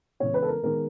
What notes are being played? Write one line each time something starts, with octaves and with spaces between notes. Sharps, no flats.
C#3 E3 G#3 B3 C#5
B4
A4
A#4
D#3 G#3 B3 A#4